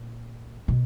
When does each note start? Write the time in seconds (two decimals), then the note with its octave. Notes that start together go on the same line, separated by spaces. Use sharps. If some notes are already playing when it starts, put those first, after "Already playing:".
Already playing: A#2
0.68 B2